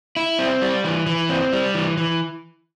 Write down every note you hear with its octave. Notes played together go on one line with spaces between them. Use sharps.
E4
C4
G3
E3
E3
C4
G3
E3
E3